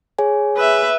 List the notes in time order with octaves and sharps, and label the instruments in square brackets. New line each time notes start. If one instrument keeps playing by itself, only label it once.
[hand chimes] G#4 C#5 G#5
[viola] B4 E5